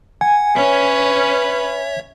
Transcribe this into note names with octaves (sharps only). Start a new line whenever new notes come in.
F#5 G#5
C#4 B4 C#5 E5